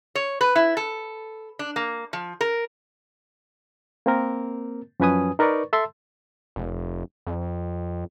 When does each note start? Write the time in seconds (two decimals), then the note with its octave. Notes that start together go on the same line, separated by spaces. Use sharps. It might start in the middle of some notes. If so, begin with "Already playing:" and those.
0.15 C#5
0.41 B4
0.56 E4
0.77 A4
1.59 D4
1.76 A#3
2.13 F3
2.41 A#4
4.06 A#3 C4 A#4
5.00 F#2 F3 C#4 B4 G#5 D#6
5.39 D#4 A#4 B4 D5 C#6
5.73 A4 E5 A5 C6 E6
6.56 F1
7.27 F2